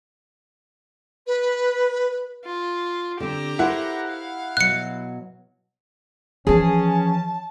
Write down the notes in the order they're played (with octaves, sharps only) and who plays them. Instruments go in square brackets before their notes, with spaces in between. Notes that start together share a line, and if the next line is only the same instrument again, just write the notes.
[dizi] B4
[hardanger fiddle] F4
[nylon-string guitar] D3 C4 [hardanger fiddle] G4 A#5
[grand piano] E4 F#5 [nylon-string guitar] A#4 C5
[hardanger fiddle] F5
[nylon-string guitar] B2 F#3 [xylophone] F#6 C#7
[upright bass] E3 F3 [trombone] C#4 [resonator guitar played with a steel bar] G#4 [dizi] A5